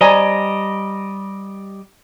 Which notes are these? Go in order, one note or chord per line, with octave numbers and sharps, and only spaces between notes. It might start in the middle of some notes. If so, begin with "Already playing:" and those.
G3 C5 D5 D#5 G#5 A#5